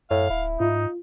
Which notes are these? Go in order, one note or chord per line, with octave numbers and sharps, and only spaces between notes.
F#2 A2 F5
D1 E4
G#2 D#4 F4